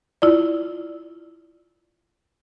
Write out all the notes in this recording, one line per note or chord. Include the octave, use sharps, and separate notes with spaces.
E4 F4 D5